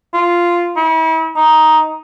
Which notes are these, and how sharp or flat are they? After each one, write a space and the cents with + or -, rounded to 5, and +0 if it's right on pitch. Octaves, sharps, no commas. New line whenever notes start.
F4 -5
E4 -40
D#4 +5